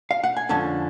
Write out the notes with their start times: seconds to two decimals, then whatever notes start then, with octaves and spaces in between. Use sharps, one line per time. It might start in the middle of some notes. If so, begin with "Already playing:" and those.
0.11 F5
0.24 F#5
0.37 G#5
0.49 F2 D3 G#3 C#4 A5